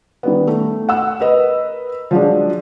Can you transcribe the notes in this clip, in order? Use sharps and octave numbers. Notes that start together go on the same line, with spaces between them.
D#3 G3 B3
A3
F#5 E6
A#4 B4 D#5
F3 F#3 G#3 D4